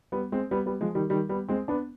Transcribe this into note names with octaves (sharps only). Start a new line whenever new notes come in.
G3 B3
G#3 C4
G3 B3
G3 B3
F3 G#3
D#3 G3
D#3 G3
G3 B3
G#3 C4
B3 D4